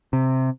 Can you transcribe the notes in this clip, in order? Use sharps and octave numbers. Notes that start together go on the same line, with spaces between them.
C3